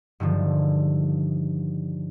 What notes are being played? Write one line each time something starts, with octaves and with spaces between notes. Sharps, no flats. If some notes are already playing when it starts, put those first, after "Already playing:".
G2 D3 D#3 F3